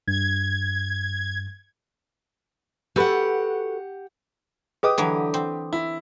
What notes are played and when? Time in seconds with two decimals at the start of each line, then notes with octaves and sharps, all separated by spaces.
0.08 G2 G#6
2.96 F#4 G4 A4 B4 F#5
4.83 G4 G#4 B4 D#5 D6 D#6
4.98 D3 E3 F#3
5.34 C4
5.73 E4